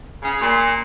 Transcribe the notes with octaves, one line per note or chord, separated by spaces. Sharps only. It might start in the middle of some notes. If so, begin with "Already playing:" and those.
C#3
A#2